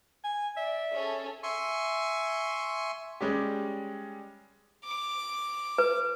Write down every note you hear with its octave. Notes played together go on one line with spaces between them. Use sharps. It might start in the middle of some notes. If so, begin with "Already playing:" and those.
G#5
D5 E5
C#4 G#4 A4
E5 G#5 C6 C#6
G3 G#3 C#4 G4
D6
B4